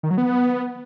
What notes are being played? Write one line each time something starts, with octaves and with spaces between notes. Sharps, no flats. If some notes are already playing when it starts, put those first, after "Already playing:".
D#3
F#3
B3